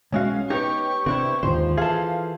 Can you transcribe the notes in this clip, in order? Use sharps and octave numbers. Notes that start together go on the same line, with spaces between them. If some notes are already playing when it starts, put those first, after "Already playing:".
B1 G#3 C#4 F#4 F5
B3 D#4 G4 C#5 C#6
C3 C4 D4 E4
D#2 G#2 D3 F3 C5
E3 G#4 A4 F5